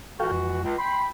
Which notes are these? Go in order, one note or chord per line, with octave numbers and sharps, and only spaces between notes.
C#2 E3 F#4 A4 F5 G5
F2
C#2
G5 B5 C6